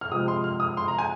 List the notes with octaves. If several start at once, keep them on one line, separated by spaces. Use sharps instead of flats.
F6
C3 F3 G#3 C4 D#6
C6
F6
D#6
C6
A#5
G#5